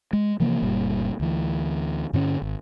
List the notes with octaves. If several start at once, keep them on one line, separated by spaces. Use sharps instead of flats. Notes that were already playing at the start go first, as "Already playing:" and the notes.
G#3
C3 E3 F3 A#3
F#1 A#2 G3
D2 E3
G2 D3 B3 C#4
G#1